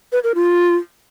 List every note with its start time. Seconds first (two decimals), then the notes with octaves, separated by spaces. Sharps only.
0.12 B4
0.24 A#4
0.35 F4